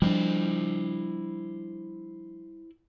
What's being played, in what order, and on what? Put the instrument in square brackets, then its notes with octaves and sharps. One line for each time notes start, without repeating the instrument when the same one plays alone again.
[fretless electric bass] F3 C4 D4 [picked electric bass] G3 [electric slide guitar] E4 C5 D#5